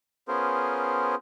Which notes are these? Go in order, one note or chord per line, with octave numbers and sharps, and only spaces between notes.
B3 C#4 F4 G#4 A#4 C5